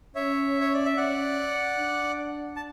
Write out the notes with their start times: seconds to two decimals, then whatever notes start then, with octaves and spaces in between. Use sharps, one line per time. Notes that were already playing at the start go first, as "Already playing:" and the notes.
0.15 C#4 C#5 E5
0.61 C#5
0.74 D5
0.86 E5
0.97 C#4 D5 F#5
1.78 D4
2.56 A5